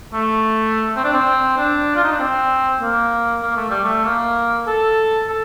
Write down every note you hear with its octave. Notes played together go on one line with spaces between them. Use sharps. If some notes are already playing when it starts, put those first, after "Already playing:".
A3
C4
D4
C4
D4
F4
D#4
D4
C4
A#3
A#3
A3
G3
A3
A#3
A4
A4